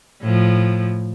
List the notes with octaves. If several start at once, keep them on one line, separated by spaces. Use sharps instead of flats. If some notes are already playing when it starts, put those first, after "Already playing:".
A2 F3